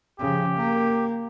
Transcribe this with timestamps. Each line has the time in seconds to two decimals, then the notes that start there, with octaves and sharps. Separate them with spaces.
0.20 C#3 F3 G4
0.56 A#3